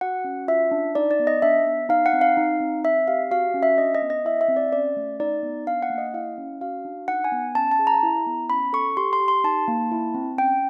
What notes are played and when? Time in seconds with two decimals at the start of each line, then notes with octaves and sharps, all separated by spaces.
0.01 F#4 F#5
0.24 C#4
0.48 F4 E5
0.71 D4
0.95 D#4 D5
1.11 D5
1.20 B3
1.27 D#5
1.42 D4 E5
1.66 B3
1.89 D#4 F5
2.06 F#5
2.13 C4
2.21 F5
2.37 D#4
2.60 C4
2.84 C4 E5
3.08 G4 F5
3.31 F#4 F5
3.54 C#4
3.63 E5
3.78 D4 D#5
3.95 D#5
4.02 B3
4.10 D#5
4.25 E4 E5
4.41 E5
4.49 C4
4.57 D5
4.72 C#4 D5
4.97 A3
5.20 D#4 D5
5.43 B3
5.67 D4 F5
5.82 F#5
5.90 A#3
5.98 D#5
6.14 E4 F5
6.38 C#4
6.61 F#4 F5
6.85 D4
7.08 D#4 F#5
7.24 G#5
7.32 B3
7.55 C#4 A5
7.71 A5
7.79 G#4
7.87 A#5
8.03 E4
8.26 B3
8.50 C#4 B5
8.73 A4 C#6
8.97 G4 C6
9.13 C6
9.20 G4
9.28 C6
9.44 D#4 A5
9.68 A#3
9.92 E4
10.14 C4
10.38 C#4 G5